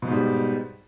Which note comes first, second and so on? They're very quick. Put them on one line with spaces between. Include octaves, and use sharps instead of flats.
B2 G#2 G3